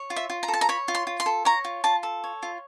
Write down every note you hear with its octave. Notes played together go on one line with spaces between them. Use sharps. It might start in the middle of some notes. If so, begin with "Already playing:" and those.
Already playing: C#5
F4
E5
F4
A#5
A4
A5
A#5
C#5 B5
F4
C6
F4
C6
A4
C#5 A#5
F4
F4 A5
A4
C#5
F4